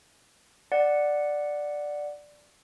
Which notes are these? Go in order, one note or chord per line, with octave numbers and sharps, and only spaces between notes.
D5 F#5